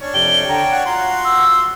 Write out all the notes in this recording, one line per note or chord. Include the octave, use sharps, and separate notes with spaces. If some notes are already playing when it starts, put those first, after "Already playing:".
C#4 D4 C#5
F2 C3 G5 G7
D3 G5 A#5
F#5
F4 F#4 A#5 C6
E6